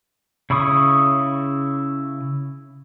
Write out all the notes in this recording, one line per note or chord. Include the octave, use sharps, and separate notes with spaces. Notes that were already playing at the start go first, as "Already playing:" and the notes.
C#3 E4 B5 C#6 D#6